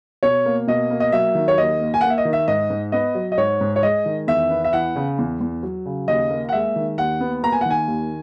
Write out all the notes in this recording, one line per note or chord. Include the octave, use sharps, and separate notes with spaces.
B2 C#5
A#3
B2 D#5
A#3
D#5
F#3 E5
D#3
C#5
D#2 D#5
A#3
G#5
A#3 F#5
E5
D#5
D#3
E5
G#2 D#5
G#2
B3 D#5
F#3
D#5
G#2 C#5
G#2
C#5
G#3 D#5
D#3
E2 E5
B3
E5
E3 F#5
C#3
E2
E2
F#3
C#3
D#2 D#5
A#3
F#5
G#3 E5
D#3
D#2 F#5
B3
A#3 A#5
G#5
F#5
D#3
G#5
D#2